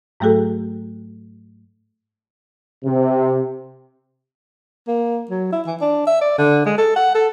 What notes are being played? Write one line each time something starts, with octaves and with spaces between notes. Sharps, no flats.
G#2 F#3 A3 F#4 G#4 A4
C3
A#3
F#3
E4
E3
D4
E5
D5
D3
G#3
A4
F#5
A4